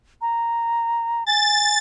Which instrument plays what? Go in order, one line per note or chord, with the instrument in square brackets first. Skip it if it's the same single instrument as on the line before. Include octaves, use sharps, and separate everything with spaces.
[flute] A#5
[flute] G#5 [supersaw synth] A6